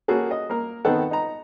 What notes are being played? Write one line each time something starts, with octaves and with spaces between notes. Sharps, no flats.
A#3 C#4 F#4 G#4 A4
D#5
A#3 A#4
D#3 B3 C4 D#4 A4 F#5
D#4 A#5